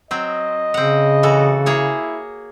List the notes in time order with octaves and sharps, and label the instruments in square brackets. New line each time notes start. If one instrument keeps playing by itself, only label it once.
[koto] F#3 C4 [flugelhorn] D#5
[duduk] C#3 [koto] C4 F#5
[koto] E3 F#4 A4
[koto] A#3 G#4 C#5 [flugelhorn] E4